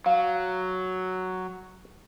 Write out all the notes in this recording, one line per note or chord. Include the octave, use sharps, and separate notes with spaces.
F#3 F5